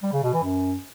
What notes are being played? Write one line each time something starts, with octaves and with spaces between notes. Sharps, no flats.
G3
C#3
B2
E3
F#2